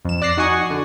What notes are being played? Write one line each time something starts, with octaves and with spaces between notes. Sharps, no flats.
F2 E7
D5 F#6 A#6 C7
D#4 F#4 D#5 F#5 G#5 C#6
D3